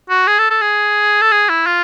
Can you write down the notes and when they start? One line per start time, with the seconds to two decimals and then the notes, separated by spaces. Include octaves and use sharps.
0.10 F#4
0.27 G#4
0.38 A4
0.50 A4
0.61 G#4
1.21 A4
1.32 G#4
1.49 E4
1.67 F4